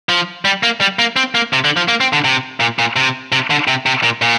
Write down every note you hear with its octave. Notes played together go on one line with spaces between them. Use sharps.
F3
G3
A#3
G3
A#3
C4
A#3
C3
D3
F3
A#3
C4
D3
C3
A#2
A#2
C3
C3
D3
C3
C3
A#2
A#2